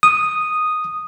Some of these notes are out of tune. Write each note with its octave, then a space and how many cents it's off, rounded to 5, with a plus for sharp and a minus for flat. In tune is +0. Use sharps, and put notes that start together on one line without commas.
D#6 -5